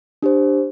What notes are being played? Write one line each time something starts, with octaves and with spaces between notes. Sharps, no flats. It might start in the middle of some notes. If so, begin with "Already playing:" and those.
D4 G4 C5